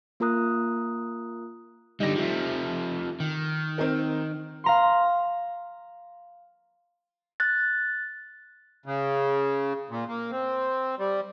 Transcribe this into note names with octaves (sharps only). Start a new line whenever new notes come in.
A#3 F4 A#4 A#5 D#6 F#6
D3 G3 D#4 G4 A#6
F3 A3
D#3
C4 D#4 A#4
F5 A#5 C6
F#6 A6
C#3
A#2
A#3
C4
G3